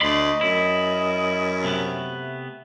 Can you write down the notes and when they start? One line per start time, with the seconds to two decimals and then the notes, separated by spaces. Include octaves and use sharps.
0.01 D2 D5 D#5 B5 C6
0.41 F#2 E4
1.64 C3 A3 B3